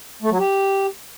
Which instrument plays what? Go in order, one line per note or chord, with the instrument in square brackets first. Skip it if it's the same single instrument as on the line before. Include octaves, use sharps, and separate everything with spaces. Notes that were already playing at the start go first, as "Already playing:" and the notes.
[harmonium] A3
F#3
G4